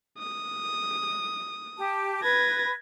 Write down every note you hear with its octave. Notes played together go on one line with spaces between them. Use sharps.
D#6
G4 A5
B4 G#6 A#6